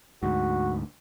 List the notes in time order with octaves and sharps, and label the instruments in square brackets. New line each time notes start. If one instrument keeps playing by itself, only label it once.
[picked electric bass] D2 G#2 [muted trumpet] F#4